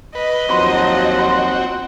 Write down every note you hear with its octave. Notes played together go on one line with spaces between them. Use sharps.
B4 D#5
D#2 F3 F#3 C4 F#4 C6 C#6
C6